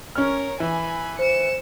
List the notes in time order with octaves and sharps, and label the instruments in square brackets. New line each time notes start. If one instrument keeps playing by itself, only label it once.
[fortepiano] C#4 F6 [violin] A#4 C#5
[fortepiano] E3 [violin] G#5 B5
[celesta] C5 [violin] C#7 E7